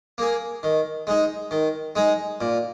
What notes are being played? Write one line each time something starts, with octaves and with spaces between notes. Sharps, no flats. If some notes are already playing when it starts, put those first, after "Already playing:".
A#3 G#4
D#3
G#3 D#4 G#4
D#3
G#3 D#4 G#4
A#2